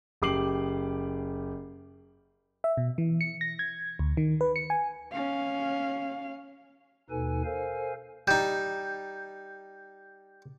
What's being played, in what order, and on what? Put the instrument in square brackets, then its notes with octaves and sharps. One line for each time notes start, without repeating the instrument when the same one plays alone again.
[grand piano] F#1 G4 D6 C7 F#7
[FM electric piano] E5
B2
E3
C#7
A#6
G#6
D2
D#3
B4
C#7
G#5
[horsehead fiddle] C#4 F5
[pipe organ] D#2 B2 D#4 A4 B4 G#5
A4 A#4 C5 F5 G#5
[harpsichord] G3 D#4 [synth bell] G6